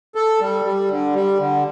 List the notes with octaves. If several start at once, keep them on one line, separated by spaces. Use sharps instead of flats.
A4
G3
G3
D3
G3
D3